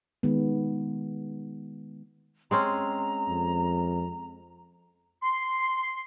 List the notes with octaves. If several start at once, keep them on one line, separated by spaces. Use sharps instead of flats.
D#3 G#3 B3
G#3 C4 C#4 A#5
F2
C6